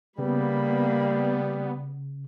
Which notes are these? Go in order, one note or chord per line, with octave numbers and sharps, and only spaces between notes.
C#3 G3 A#3 B3 B5